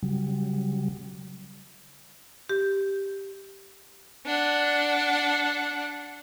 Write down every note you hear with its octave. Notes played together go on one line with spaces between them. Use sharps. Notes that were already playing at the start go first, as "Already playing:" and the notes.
C#3 F#3 G3
G4
D4 F#5